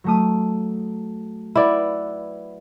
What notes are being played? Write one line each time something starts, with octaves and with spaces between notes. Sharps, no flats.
F#3 A3 D#6
E4 B4 D5 F#5 B5